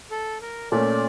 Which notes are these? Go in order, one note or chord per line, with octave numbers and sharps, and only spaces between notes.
A4
A#4
A#2 A3 C#4 D5